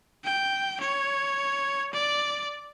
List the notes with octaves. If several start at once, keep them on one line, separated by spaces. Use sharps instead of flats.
G5
C#5
D5